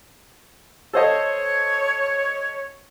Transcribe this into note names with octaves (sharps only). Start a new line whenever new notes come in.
A4 C5 C#5 D#5